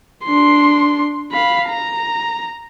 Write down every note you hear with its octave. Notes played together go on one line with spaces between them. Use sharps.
D4 C6
F5 B5
A#5